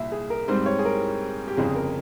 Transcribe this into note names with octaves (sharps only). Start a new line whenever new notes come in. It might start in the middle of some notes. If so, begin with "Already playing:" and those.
Already playing: C2 A#2 E5
G#4
A#4
G#2 G3 C4 C5
C#5
G#4
A#4
G4
G1 F2 C#3 G#4
A#4